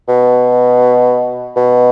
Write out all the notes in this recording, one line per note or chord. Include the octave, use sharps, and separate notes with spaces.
B2
B2